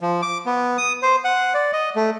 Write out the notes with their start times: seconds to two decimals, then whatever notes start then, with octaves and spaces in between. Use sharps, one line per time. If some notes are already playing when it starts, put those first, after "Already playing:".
0.01 F3
0.22 D6
0.46 B3
0.78 D#6
1.02 C5
1.24 F#5
1.54 D5
1.73 D#5
1.96 A3